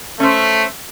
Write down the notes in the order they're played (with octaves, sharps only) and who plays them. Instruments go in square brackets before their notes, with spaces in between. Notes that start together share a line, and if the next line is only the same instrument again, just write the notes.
[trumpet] A3 [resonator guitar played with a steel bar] C#4 C5